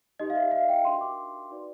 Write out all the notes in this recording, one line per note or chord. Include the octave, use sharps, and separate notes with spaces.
D#4 G4 B4 D#5
F5
E5
F5
G5
D4 F#4 A#4 C6
D6
D#4 F#4 B4 D5